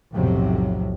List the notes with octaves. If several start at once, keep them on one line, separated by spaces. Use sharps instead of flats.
B1 F2 A2 C3 F#3